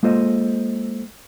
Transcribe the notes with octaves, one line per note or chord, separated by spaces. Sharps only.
G#3 A#3 F4 A4 C5 D#5